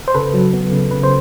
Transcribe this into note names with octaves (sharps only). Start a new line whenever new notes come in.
C5
C#3 A4 B4
F#3
B3
C#3
C#3 B4
C5